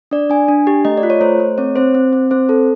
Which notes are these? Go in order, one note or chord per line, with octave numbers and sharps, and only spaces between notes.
D4 D5
D4 G#5
D4
G4
A3 D#5
D5
F4
C#5
A3 C5
A3
C4 C#5
C4 C5
C4
C4
C4 C5
A4